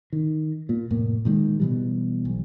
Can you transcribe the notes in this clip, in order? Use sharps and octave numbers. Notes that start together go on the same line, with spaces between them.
D#3
A#2
F1 A2 A#3
A#2 D#3 G#3
B2 E3 G3
B1